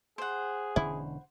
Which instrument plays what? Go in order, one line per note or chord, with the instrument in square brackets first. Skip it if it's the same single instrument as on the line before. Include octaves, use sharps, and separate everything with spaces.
[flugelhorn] G#4 [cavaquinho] C5 F#5
[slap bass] E1 D3 C#4 [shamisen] E4